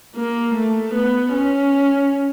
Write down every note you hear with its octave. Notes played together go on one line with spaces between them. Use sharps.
A#3
A3
B3
C#4